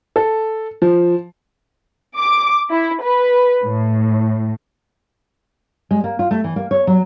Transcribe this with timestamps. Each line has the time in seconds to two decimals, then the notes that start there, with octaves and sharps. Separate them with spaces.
0.16 A4
0.82 F3
2.18 D6
2.71 E4
3.04 B4
3.64 A2
5.91 G#3
6.04 A#3
6.19 F4
6.31 A3
6.44 E3
6.56 A#3
6.71 C#5
6.87 F#3